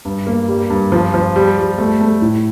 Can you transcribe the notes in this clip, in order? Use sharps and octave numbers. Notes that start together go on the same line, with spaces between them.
G2
A#3
G3
G2
F3
F3
G3
G3
A3
A3
A2